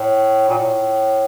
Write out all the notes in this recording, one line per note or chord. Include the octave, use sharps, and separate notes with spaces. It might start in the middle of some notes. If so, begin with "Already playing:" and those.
Already playing: A2
A#2
A2